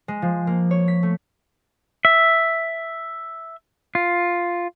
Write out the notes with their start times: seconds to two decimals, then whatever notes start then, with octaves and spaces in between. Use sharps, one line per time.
0.08 G#3
0.22 F3
0.47 A#3
0.71 C#5
0.88 B6
1.03 A3
2.05 E5
3.95 F4